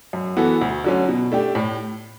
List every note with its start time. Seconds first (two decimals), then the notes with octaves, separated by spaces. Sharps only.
0.13 F#2
0.37 E3 B3 F#4 A4
0.61 D2
0.84 D3 F#3 C#4
1.09 B2
1.32 A3 D4 G4
1.55 A2